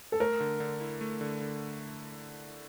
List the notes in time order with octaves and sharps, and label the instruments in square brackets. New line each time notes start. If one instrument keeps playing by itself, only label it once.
[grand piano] A4
[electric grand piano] A3 [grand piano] A#4
[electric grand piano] D3
D3
E4
A3
D3
D3